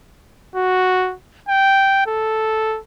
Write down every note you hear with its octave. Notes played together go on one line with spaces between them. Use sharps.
F#4
G5
A4